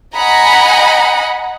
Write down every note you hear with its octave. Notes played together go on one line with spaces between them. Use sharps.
D#5 F#5 G#5 A#5 B5